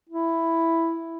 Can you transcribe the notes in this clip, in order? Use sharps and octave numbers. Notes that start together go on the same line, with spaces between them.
E4